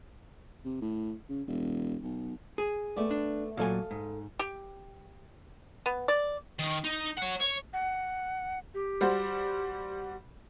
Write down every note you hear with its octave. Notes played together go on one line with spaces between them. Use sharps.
C3
A2
C#3
E1
B1
G#4
A3 B3 D5
D4
A#2 F#3 A4 D#5 F5 G#5
G#2
G4
B3
D5
D#3
D#4
C#5 F#5
C#5
F#5
G4
G3 F#4 C5